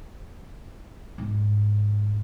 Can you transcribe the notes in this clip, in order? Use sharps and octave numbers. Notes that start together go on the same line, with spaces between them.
G#2